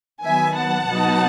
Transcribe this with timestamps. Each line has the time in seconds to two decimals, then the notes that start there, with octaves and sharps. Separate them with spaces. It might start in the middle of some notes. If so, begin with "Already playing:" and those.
0.23 D#3 F#3 B3 E5 G#5
0.55 F#5 A5
0.88 B2 F#3 B3 D#4